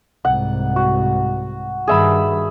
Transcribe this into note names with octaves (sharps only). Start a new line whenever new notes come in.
C2 G#2 F#5
F#4
G2 D#3 G#4 E5 B5